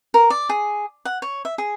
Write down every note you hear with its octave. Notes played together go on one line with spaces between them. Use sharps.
A#4
D5
G#4
F#5
C#5
E5
G#4